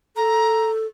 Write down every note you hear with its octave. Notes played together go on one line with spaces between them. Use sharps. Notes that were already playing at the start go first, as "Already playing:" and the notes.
A4 A#5